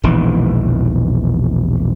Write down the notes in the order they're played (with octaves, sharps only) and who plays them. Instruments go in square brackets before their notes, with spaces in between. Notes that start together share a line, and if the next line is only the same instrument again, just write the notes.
[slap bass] E1 A#1 D#3 E3